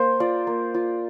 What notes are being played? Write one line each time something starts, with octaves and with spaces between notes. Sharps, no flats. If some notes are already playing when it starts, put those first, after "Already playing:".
Already playing: A#3 C5
F4 D5
A#3
F4